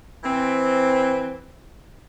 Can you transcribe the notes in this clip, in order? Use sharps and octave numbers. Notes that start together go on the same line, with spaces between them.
E3 C4